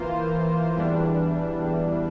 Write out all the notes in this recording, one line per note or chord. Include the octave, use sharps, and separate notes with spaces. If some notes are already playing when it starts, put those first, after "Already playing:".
Already playing: E3 A#3 F4 C5
E2 E3 G3 D4